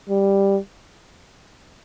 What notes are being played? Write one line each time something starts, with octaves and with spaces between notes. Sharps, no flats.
G3